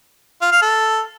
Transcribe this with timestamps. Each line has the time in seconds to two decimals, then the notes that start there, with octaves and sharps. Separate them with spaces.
0.42 F4
0.52 F5
0.62 A4